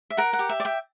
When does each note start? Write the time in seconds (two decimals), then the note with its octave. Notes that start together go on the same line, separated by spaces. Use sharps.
0.10 E5
0.17 A#4 F#5
0.33 F#5
0.39 G4
0.49 E5
0.60 D5
0.65 E5 G5